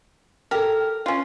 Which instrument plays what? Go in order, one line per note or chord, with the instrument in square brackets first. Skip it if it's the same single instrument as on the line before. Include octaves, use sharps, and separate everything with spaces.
[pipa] G4 A#4 [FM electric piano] A4 F6
[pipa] C#4 F4